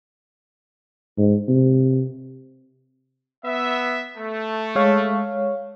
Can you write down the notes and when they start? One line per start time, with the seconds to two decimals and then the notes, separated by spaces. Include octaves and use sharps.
1.17 G#2
1.48 C3
3.45 B3 E5
4.17 A3
4.75 G#3 C#5 F5